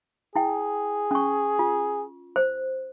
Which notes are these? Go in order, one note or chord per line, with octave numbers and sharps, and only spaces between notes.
E4 G#4 G5
C#4 C#6
F4
C5